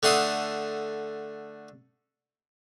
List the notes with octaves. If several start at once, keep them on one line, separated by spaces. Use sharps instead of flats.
D3 A3 F#5 C6 D#6